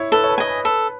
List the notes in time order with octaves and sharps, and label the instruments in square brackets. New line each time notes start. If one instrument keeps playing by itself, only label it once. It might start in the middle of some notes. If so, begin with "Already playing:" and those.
Already playing: [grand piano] E4 C#5
[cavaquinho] A4 [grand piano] B4
[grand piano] C#5
B4
[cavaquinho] D#5 G#5
[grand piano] B4
[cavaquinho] A4 [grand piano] B4